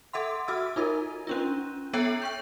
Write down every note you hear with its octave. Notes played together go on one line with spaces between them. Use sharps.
A4 E5 F#5 C6
F#4 A4 E5 E6
D#4 F4 A#4
C#4 D4 F4
B3 A4 C#5 E5 G5
G5 C#6 G6